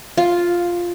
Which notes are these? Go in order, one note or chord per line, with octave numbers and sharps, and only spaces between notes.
F4